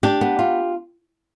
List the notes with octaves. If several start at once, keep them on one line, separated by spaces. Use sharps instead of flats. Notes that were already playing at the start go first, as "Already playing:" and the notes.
D4 G4
B3
F4